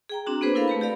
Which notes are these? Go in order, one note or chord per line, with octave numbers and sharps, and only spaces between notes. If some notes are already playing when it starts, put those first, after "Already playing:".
G#4 G5 A#5
C4 D4 F#4
A#3 B3 D4 G#4 B4 C5
E4 A4 A#4 F5 B5
A3 G4 B4
G4 D5 F5 B5